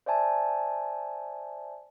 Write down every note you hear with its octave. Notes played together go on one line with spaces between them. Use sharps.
C5 D5 E5 G#5 A5